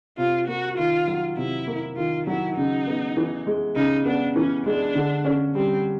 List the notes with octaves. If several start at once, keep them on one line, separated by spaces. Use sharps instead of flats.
C3 F4
A#3 F#4
D#3 F4
F#3
C3 E4
A#3
D#3 F4
F#3 E4
C#3 D#4
B3
E3
G#3
C#3 D#4
B3 D4
E3 C#4
G#3 D4
D3
C#4
G3 C4